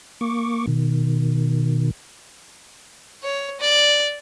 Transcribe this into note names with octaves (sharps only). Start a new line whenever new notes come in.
A#3 C#6 D6
B2 D#3
C#5
D5